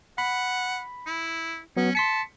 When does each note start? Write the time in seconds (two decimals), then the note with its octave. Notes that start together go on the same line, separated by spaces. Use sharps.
0.18 F#5 B5
1.06 E4
1.77 F#3 B3 C#4
1.95 A5 C6 B6 C#7